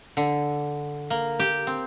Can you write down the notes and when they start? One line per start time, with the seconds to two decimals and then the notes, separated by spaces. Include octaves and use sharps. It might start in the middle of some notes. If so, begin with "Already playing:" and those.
0.17 D3
1.10 A#3
1.39 G4
1.67 C4